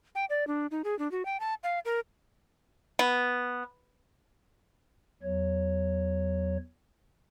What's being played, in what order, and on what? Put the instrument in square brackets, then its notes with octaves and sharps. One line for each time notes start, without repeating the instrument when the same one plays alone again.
[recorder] G5
D5
D4
D#4
G#4
D4
F#4
G5
A5
F5
A#4
[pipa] B3
[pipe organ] E2 F#3 C#5